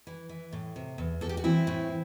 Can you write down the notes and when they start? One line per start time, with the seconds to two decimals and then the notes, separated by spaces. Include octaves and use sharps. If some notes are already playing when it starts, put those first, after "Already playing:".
0.07 E3
0.29 E3
0.53 A2
0.76 C3
0.98 E2
1.21 E2 A4
1.29 G4
1.37 F#4
1.44 E3 C4 E4
1.67 A2